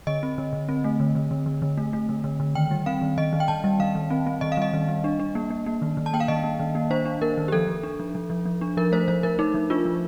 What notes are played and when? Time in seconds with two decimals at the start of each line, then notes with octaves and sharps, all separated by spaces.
0.07 D3 D#5
0.23 C4
0.38 D3
0.53 D3
0.69 C4
0.84 A3
1.00 D3
1.15 D3
1.31 D3
1.46 D3
1.62 D3
1.77 A3
1.93 A3
2.09 D3
2.24 D3
2.40 D3
2.55 D#3 G5
2.71 G3
2.86 C4 F5
3.02 D#3
3.18 D#3 D#5
3.33 D#3
3.40 G5
3.48 D#3 A5
3.64 G3
3.80 D#3 F5
3.95 D#3
4.10 C4
4.26 C4
4.41 D#3 D#5
4.52 F5
4.57 G3 D#5
4.73 D#3
4.88 G3
5.04 D4
5.20 D4
5.35 A#3
5.51 A#3
5.66 A#3
5.82 D#3
5.97 D#3
6.06 A5
6.13 A#3 G5
6.20 F5
6.28 D#3 D#5
6.44 A#3
6.59 D#3
6.75 A#3
6.90 D4 C5
7.06 D4
7.22 A#3 A#4
7.38 D#3
7.48 G4
7.52 F3 A4
7.68 F3
7.83 D4
8.00 F3
8.15 F3
8.30 F3
8.46 F3
8.61 D4
8.77 F3 A#4
8.92 A3 C5
9.08 F3 C5
9.23 F3 A#4
9.39 F3 D#4
9.54 F3
9.70 D4 F4
9.85 F3